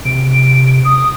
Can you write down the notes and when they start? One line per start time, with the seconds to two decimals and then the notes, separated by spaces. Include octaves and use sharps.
0.05 C3 D7
0.85 D#6